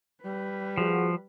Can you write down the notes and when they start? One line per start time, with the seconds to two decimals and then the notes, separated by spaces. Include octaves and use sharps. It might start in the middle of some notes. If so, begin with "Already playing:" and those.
0.23 G3 B4
0.78 F3 F#4 G#4